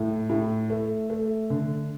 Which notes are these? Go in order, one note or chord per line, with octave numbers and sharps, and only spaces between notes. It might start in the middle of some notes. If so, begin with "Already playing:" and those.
Already playing: A2
A2
A3
A3
D3